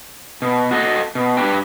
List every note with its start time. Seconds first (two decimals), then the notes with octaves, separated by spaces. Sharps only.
0.42 B2
0.71 F#4 A4 D#5
1.15 B2
1.37 G2 D4 G4 B4 G5